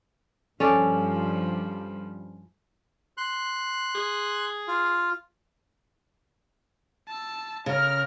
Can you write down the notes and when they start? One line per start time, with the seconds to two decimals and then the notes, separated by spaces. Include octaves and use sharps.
0.60 G2 F3 G3 C#4 A4 D5
3.17 C6 F#6
3.95 G#4
4.68 F4
7.08 A5 E6
7.66 C#3 A#4 F6